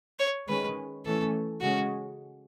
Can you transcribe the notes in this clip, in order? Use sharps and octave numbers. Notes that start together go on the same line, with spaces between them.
C#5
D#3 G#3 C#4 B4
E3 A3 C#4 A4
C#3 G#3 C#4 F#4